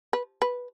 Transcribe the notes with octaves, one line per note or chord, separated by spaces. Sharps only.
B4
B4